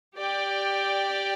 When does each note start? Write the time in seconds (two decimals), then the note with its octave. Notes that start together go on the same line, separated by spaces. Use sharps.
0.16 G4 D5 G5